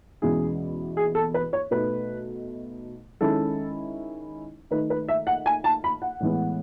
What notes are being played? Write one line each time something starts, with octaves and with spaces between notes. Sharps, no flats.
E2 B2 G#3 C#4 E4 G#4
G#4
A4
B4
C#5
B2 A3 D#4 B4
D#3 G#3 C#4 E4 A4
D#3 A3 D#4 B4
B4
E5
F#5
G#5
A5
B5
F#5
A2 E3 G#3 B3